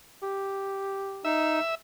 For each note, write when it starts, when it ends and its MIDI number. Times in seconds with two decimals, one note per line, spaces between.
0.23 1.32 67
1.25 1.60 63
1.25 1.75 76